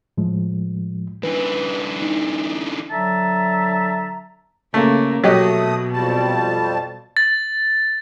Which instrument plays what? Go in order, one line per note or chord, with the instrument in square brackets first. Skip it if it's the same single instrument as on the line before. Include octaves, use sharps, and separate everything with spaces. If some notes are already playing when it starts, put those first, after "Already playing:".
[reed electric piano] A2 F3 G#3
[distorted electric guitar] D3 E3 [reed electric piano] B4
[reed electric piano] D#4
[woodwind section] D3 F#3 E5 A5 A#5
[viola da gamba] C#3 A#3 [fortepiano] A3
[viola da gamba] B2 [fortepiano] F#3 G4 D#5 [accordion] A3 D#6
[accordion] F2 G3 A5
[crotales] A6